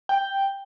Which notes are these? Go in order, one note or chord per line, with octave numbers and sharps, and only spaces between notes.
G5